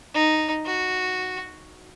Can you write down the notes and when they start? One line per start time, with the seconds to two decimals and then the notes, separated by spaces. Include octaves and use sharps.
0.14 D#4
0.66 F#4